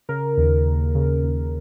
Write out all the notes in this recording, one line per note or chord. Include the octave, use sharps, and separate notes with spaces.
C#3 A#4
D#2
D#2
C#3
D#2